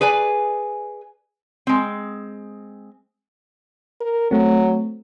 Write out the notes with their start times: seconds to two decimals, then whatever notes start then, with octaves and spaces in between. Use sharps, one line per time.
0.01 G#4 B4 D5 G#5
1.67 G#3 C4
4.01 A#4
4.31 F#3 A3 C4